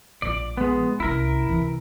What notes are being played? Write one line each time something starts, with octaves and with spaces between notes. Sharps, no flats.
A#1 F3 D5
G#3 B3
C2 C#4 E4 A#4
C3 E3